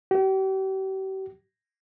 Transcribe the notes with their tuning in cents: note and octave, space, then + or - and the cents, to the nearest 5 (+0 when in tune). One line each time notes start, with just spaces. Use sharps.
G4 -40